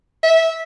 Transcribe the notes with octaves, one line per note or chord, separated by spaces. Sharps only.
E5